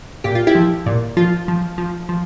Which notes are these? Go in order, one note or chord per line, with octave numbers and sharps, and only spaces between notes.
A#2 G4
F4
E4 G4
F3
A#2
F3 F4
F3
F3
F3